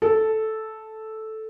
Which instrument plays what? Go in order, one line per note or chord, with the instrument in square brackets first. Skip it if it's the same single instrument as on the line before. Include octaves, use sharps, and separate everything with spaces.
[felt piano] A4